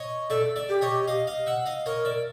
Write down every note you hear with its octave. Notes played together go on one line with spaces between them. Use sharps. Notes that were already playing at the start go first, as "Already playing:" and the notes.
Already playing: C#5 D#5
A4 D5 E5
D5 E5
G4
C#5 D#5
D#5 F5
D#5 F5
E5 F#5
D#5 F5
A#4 C#5 D#5
D5 E5